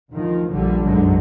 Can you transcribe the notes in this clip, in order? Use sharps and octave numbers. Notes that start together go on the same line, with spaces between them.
D2 D#3 F3
A#1 D3 G3
F#1 B1 G#2 D3 F#3